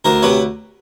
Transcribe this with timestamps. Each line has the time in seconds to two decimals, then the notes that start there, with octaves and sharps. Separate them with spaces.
0.05 D2 A#4 C5
0.22 C3 B4 C#5